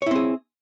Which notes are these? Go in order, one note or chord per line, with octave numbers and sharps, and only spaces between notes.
C4 E4 G#4 C#5